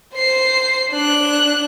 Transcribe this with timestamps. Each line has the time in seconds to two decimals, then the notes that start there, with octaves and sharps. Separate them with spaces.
0.15 C5 C7
0.91 D4 F#6